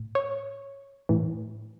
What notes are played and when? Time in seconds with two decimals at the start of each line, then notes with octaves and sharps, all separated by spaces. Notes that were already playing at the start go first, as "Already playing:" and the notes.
Already playing: A2
0.15 C#5
1.09 A2 E3